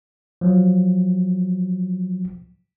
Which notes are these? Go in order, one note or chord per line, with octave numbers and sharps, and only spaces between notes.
F3 F#3